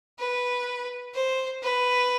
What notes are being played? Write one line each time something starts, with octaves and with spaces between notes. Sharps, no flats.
B4
C5
B4